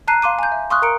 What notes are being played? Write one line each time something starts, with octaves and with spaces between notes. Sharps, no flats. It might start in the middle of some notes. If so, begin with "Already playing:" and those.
A5 A#5 F#6 C7 D#7
F5 C6 D6 D#7
G#5 A#5 G6
E5
F5 C6 C#6 D#6 F6 F#6
A#4 A#5 C#6 C#7 D7